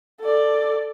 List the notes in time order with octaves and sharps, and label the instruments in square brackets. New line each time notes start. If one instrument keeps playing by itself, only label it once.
[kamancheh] A4 D5